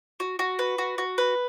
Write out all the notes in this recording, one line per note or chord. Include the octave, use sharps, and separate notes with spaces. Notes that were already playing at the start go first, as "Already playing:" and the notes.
F#4
F#4
B4
F#4
F#4
B4